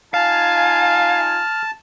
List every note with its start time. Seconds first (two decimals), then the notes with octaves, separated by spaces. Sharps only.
0.14 D#4 F4 F5 G#5 A5 F6